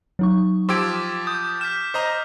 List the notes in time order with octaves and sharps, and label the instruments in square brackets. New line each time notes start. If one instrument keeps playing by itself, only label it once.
[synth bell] F#3 D#4 C#6
[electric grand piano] F3 G4 D7 [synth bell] C6 E6 G#6 [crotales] D6
[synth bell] D#6 [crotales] G6
[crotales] F6 B6 [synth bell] G6 E7
[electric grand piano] C5 D#5 A#5